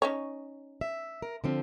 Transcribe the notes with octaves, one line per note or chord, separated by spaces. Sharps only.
C#4 D#4 C#5
E5
A#4
D3 F3 C4